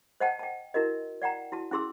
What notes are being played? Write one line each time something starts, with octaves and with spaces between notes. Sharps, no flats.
C5 D#5 F#5 G5 A5
G5 A5
E4 F#4 A#4 D#5
D5 F#5 G5 A#5
E4 F#4 A5
C#4 E4 G#4 C6 E6